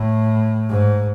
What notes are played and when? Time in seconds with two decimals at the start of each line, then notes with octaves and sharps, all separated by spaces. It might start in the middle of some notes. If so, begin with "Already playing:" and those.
Already playing: A2
0.69 G#2